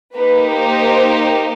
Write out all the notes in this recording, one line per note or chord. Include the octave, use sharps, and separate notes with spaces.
A#3 D#4 G4 B4
C5